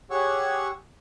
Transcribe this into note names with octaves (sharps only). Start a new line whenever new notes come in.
G4 G#4 C#5 F#5 C#6 E6